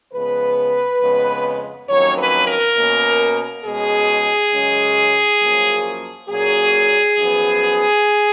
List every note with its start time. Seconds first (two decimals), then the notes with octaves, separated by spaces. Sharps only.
0.13 C#3 F3 G#3 B3 B4
1.00 F2 C#3 G#3 B3
1.88 F2 D#3 F#3 A#3 C#4 C#5
2.18 B4
2.48 A#4
2.77 B2 A#3 C#4
3.64 B2 G#3 C#4 G#4
4.53 F#2 C#3 G#3 C#4
5.41 F#2 F3 A#3 C#4
6.29 A#2 F#3 A#3 C#4 G#4
7.17 F#2 F3 B3